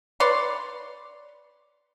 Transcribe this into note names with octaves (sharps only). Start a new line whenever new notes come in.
B4 C#5 D5 C6